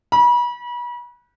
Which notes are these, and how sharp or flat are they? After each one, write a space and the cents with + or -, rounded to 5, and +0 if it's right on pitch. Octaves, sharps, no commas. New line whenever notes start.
B5 -35